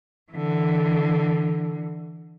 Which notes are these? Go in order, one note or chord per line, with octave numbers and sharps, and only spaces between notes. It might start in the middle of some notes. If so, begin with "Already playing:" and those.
D3 E3